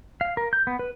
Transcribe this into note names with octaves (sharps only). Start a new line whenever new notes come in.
F5
A#4
G6
B3
B4